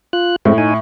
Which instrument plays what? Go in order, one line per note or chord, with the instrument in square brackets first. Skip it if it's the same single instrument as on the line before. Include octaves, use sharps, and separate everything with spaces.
[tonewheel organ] F4 F#6
[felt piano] A2 [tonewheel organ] G#3 C4
[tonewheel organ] D#4 G#5